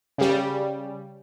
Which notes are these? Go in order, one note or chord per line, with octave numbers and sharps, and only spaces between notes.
C#3 G3